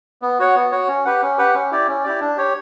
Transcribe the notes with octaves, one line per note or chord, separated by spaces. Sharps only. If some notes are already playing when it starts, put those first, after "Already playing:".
B3
F#4 C#5 F#5
B3
F#4 C#5 F#5
C#4
G4 B4 F#5
C#4
G4 B4 F#5
C#4
E4 G4 D5
C#4
E4 G4 D5
D4
G4 C#5